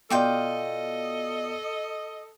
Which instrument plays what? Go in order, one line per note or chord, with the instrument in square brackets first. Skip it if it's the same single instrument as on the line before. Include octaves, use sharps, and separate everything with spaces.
[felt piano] B2 D5 [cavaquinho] F4 G5 D6 [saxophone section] A4 D#5